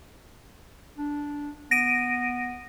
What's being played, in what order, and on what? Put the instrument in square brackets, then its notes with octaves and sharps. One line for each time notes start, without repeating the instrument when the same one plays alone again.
[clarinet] D4
[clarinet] B3 [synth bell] A#6 D7 D#7